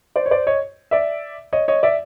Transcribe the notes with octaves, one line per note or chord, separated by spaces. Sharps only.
C5 D5
C#5
C5 D5
C#5 D#5
D5 E5
C#5 D#5
C#5 D#5
D5 E5